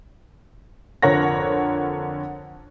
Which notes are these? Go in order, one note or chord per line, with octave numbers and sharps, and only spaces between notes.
F2 D3 A#4 C#5 F#5 A#6